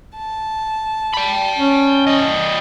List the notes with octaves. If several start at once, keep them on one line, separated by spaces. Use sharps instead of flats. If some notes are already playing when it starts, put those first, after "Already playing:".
A5
G5 B5
C#4
G3 D#5